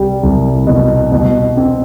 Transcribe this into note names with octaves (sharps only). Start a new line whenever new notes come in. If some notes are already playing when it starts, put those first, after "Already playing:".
Already playing: C2 G3
C2
B2
B2
C4